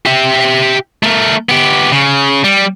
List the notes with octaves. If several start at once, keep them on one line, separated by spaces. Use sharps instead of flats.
G4 E5
A3 A#4
B3 G4
C#3
G3